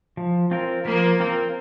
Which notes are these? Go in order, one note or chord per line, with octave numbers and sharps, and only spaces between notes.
F3
C4 F4 A#4
F3 A#3
C4 F4 A#4